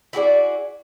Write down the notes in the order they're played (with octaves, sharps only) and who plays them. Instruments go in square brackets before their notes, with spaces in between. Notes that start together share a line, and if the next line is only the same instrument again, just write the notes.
[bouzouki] E4 F#4 G#4 D5